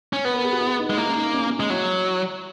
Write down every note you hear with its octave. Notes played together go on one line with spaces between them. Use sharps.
C#4
B3 B4
A#4
G#4
F#4
E4
D#4
G#3
D#4
A#3 E4
C#4
D#4
C#4
C#4
G#3 C#4
F#3 E4